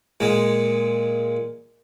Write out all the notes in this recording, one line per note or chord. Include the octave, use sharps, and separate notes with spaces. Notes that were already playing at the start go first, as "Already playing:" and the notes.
A#2 G#3